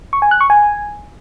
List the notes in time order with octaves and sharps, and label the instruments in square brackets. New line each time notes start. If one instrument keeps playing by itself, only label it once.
[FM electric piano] C#6
G#5
F#6
C#6
G#5